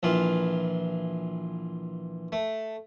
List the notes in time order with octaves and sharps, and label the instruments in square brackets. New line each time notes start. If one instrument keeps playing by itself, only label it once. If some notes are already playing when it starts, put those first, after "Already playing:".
[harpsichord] A#1 E3 F4
A3